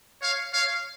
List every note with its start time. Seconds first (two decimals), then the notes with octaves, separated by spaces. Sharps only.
0.21 C#5 F5
0.53 C#5 F5